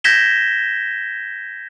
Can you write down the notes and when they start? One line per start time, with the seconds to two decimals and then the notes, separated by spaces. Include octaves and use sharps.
0.04 G6 G#6 A#6 B6 E7 G7